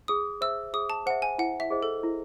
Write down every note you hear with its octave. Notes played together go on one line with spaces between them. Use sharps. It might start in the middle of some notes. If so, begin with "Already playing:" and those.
G#4 D#6
C5 E5 E6
G#4 D#6
A5
C5 E5 F#5
G#5
E4 F#5
E5
G#4 C5 D#5
A4
E4